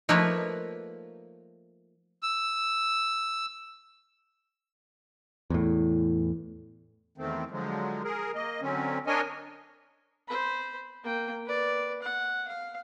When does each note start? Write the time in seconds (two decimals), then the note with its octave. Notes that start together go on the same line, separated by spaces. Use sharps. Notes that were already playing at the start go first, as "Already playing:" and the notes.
0.09 F3 A3 A#3 D#4 B4 C#5
2.23 E6
5.50 E2 A2
7.18 E2 D#3 A3 C4
7.51 D3 F3 F#3 G#3
8.04 G#4 A#4
8.35 A#3 D#5
8.62 D3 F#3 C4 C#4
9.07 D4 A#4 C#5 D#5 G#5
10.28 C5 B5
11.04 A#3 G5
11.45 B4 D5
12.02 F#5
12.48 F5